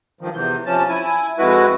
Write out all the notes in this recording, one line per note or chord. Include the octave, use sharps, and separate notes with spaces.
G2 D#3 F3
E2 C3 E3 G6
C3 F3 C#4 A5
E4 G#5
F2 G#3 E4 F#4 B4